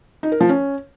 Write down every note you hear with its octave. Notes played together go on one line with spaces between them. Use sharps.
D#4
A#4
F3
C#4